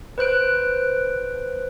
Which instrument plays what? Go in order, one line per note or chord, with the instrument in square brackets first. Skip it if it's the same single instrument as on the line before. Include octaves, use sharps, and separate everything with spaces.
[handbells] B4 C5 F#6 D7